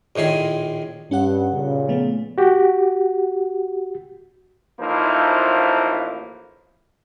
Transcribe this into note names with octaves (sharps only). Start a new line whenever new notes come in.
A#1 A2 D#3 G#4 C6
G2 C#4 G4 F#5
A#2 C#3
F3 A3 B3
F#4 G4
A1 F3 A#3 D#4 E4 C5